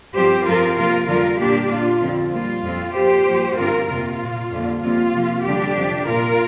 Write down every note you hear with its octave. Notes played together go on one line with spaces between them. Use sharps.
G2 F3 C4 G4 C5
F2 F3 C4 F4 A#4
C3 F3 A#3 F4 A#4
F2 D3 G3 F4 A#4
A#2 G3 A#3 D4 G4
A#2 A#3 F4
F2 D3 F3 C4
A#2 G3 A#3 F4
F2 F3 C4
A#2 F3 A#3 G4 C5
G2 F3 A#3
G2 D3 G3 C4 F4 A#4
F2 C3 A#3 F4
A#2 A#3
F2 D3 G3 A#3
F2 C3 A#3 F4
C3 F3 A#3
F2 D3 G3 D4 G4
F2 C3 F3
A#2 A#3 F4 A#4